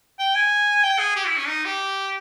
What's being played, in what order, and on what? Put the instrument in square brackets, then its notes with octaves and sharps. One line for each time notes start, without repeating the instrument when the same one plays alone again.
[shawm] G5
G#5
G5
G#4
G4
E4
C#4
D#4
G4